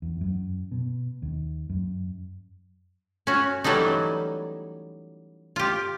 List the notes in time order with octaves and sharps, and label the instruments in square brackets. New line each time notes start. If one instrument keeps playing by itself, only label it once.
[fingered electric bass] E2
F#2
B2
D#2
F#2
[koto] C#4 F#4
E3 F#3 G3 A3 D#4
F4 G4